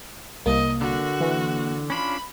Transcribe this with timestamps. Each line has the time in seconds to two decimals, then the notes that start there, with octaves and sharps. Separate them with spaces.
0.46 C2 A#3 D#5
0.81 D3 F#4
1.20 E3
1.90 C#4 D4 F4 B5